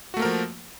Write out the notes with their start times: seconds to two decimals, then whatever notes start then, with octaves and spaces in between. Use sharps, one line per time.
0.14 F#4
0.17 A3
0.19 A#3
0.22 A#4
0.25 F3